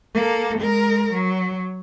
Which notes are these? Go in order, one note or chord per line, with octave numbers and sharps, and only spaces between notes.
A#3 A4
G#3 A#4
F#3